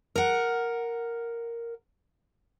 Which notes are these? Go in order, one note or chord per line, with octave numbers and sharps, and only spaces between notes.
A#4 F#5